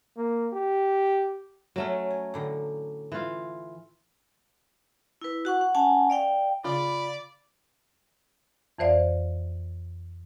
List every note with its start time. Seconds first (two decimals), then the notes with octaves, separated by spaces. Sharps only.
0.17 A#3
0.53 G4
1.76 F#3 A3 C#4
2.10 G#5
2.34 A2 D3 A#5
3.12 E3 F4
5.21 E4 B4
5.45 F#4 F#5 C#6
5.61 F#5
5.75 C#4 F#5 G#5 A5
6.10 D5 F5 G5
6.64 C#3 F4 D5 B5
8.78 F2 E3 C5 D5 F5